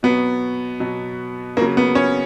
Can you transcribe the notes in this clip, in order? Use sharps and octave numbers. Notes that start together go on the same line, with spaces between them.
B2 F#3 B3
B2 F#3
C#3 F#3 A#3
B3
C#4